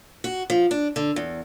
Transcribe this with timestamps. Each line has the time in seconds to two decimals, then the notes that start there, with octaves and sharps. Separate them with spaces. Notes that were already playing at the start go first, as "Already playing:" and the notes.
0.24 F#4
0.50 F3
0.71 D4
0.96 D3
1.16 E2